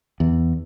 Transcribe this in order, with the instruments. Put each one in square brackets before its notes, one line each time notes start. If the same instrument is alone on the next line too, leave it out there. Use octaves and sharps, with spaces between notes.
[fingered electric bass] E2